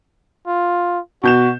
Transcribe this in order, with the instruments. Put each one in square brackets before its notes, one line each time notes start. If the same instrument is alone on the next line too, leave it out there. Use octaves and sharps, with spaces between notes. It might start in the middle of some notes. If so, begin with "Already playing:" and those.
[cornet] F4
[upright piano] B2 G6 E7 [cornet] F#4